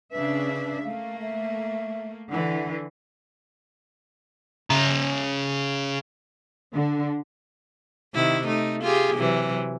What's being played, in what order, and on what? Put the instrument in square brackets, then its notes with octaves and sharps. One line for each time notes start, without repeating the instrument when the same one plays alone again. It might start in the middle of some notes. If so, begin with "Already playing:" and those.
[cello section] C#3 D4 E5 [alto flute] B4
[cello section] A3 A#3 [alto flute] F5
[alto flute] E5
[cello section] D3 E3 [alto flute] F#5
[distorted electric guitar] C#3 A#5
[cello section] D3
[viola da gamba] C3 D#3 E4
A3 D#4
F4 G4 G#4
C3 E3 F#3